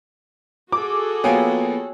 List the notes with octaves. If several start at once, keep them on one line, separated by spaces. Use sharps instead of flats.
F#4 G#4 A4 D6
F3 A#3 B3 C#5 G5 G#5